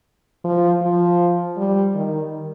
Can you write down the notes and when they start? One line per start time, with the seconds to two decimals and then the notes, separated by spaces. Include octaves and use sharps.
0.44 F3
0.82 F3
1.57 G3
1.95 D#3